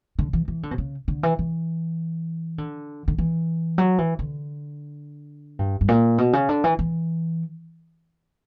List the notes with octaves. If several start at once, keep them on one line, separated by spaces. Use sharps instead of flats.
D3
E3
E3
D3
B2
C#3
D3
E3
E3
D3
D3
E3
F#3
E3
D3
G2
G2
A#2
B2
C#3
D3
E3
E3